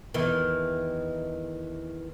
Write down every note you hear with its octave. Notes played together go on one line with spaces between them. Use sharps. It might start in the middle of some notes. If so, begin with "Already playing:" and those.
E2 D#3 E3